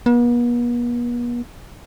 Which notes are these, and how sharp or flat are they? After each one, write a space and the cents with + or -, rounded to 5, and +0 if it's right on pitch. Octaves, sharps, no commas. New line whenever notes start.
B3 -45